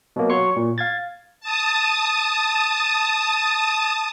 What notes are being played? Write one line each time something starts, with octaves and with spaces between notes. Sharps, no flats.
B2 F#3 A#3
F#3 C#5 C6 C#6 C#7
A#2
F5 G#6 A6
A5 D#6